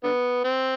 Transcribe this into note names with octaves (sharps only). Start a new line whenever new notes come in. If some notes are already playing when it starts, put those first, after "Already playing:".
D3 B3
C4